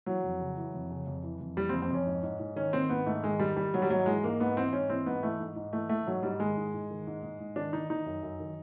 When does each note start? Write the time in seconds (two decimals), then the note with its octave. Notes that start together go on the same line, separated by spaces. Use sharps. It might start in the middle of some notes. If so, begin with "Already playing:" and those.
0.06 E3 F#3
0.23 F2
0.40 C#3
0.57 E3
0.74 F2
0.91 C#3
1.07 F2
1.24 E3
1.41 F2
1.57 E3 G3
1.69 C4
1.74 F2
1.82 C4
1.91 F2 C#4
2.07 G#2
2.23 G#2
2.40 G#2
2.56 D#3 C#4
2.73 D#3 C4
2.90 G#2 B3
3.06 G#2 A3
3.23 D#3 G#3
3.39 D#3 G3
3.56 D#3 G3
3.73 D#3 F#3
3.82 G3
3.90 G#2 F#3
4.06 E3 G#3
4.24 G#2 A#3
4.40 G#2 B3
4.56 E3 C4
4.73 G#2 C#4
4.90 E3 C4
5.06 G#2 B3
5.23 E3 A3
5.40 G#2
5.56 G#2
5.73 E3 A3
5.89 E3 A3
6.07 G#2 F#3
6.23 G#2 G3
6.39 D#3 G#3
6.57 G#2
6.74 G#2
6.90 D#3
7.07 G#2
7.23 G#2
7.40 G#2
7.56 D#3 D4
7.73 D#3 D#4
7.90 D#3 D#4
8.06 F#2
8.23 F#2
8.40 D#3